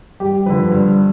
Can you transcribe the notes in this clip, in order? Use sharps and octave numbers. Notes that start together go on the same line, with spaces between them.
G2 G4
D3 F3 B4
G2